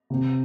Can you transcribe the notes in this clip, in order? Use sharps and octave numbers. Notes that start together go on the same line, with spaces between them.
C3